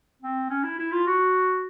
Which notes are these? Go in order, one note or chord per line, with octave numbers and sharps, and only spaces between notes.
C4
C#4
E4
E4
F4
F#4